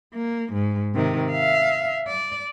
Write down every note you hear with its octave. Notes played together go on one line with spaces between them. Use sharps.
A#3
G#2
C3 D#3
E5 F5
D5